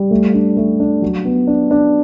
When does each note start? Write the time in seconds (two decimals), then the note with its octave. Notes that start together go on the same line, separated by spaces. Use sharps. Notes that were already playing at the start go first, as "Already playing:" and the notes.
Already playing: G3
0.11 A3
0.34 D4
0.57 A3
0.80 D4
1.02 F#3
1.25 B3
1.47 D4
1.71 D4